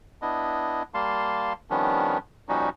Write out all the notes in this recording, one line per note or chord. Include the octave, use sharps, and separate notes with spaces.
B3 D4 E4 D#5
G3 A#3 F5 A5 C6
D#3 F3 G3 B3 C#4 D4
A#2 F3 G3 C#4 D#4 F#4